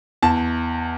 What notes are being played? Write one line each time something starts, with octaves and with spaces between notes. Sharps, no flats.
E2 A5